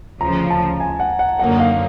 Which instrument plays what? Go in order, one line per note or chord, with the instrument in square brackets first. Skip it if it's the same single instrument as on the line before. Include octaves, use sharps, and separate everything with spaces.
[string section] D2 C#3 F3 [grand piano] A#5
[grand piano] A5
G#5
F#5
F#5
[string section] F#2 D3 F#3 A#3 D#4 [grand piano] F#5
[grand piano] F5